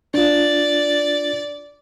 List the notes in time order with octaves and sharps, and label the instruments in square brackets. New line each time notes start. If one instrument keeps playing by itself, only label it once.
[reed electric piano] D4 F4 [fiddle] D5